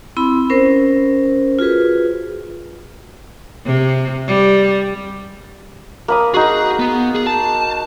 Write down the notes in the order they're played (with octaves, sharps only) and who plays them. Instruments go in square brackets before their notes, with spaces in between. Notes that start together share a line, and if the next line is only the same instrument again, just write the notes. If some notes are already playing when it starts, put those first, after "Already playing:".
[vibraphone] C4 E4 B5
C#4 A#4 C5
F4 F#4 G#4 B4
[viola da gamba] C3
G3
[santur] A#3 B5 D#6
[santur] D#4 F#4 [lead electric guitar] G#4
[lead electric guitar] B3
G#4
A5